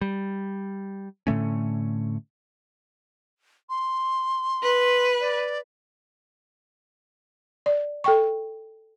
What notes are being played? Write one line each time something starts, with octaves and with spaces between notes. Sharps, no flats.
G3
A2 D3 A3 C#4
C6
B4
D5
D5
A4 G5 C#6